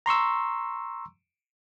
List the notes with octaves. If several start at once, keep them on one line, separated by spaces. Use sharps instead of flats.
A#5 C6 C#6 E6